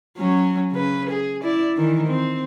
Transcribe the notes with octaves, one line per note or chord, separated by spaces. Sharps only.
F#3 C#4
C#3 B4
G#4
E4 D5
D#3 E3
C4